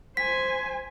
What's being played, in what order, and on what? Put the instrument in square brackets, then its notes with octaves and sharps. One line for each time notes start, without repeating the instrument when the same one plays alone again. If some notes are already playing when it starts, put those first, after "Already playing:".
[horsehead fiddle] C5 G#5 [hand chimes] B6